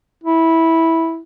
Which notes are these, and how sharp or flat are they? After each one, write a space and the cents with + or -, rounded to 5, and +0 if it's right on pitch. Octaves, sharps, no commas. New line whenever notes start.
E4 -10